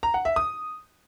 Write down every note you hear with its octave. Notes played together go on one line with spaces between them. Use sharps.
A#5
F#5
E5
D#6